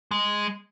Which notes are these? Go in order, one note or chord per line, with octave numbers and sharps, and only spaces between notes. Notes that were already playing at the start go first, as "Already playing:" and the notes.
G#3